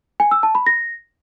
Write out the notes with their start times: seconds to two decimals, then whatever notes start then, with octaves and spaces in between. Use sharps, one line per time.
0.20 G#5
0.31 E6
0.43 A5
0.55 B5
0.66 A#6